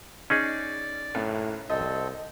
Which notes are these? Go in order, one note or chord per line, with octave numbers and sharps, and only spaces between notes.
C#4 D#4 G#4 D5
F#1 A2
C2 C4 A4 D#5